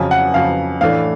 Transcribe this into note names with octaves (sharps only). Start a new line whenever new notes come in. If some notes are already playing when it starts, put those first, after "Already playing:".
Already playing: F2 C#3 F#3 G#5
F#5
F2 C#3 F#3 F5
A2 E3 A3 D4 F5